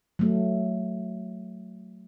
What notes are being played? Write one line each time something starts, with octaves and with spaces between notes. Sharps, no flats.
F#3 A3